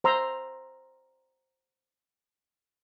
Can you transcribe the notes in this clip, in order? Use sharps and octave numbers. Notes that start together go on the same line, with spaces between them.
C5 A#5 C6 E6